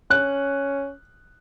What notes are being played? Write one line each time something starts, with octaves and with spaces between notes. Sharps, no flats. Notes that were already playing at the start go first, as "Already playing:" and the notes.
C#4 F#6